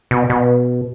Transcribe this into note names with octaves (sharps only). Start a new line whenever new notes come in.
B2
B2